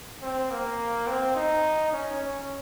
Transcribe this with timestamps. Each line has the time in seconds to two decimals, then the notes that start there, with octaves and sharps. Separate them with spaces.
0.21 C4
0.51 A#3
1.07 C4
1.36 D#4
1.93 C#4
2.21 C#4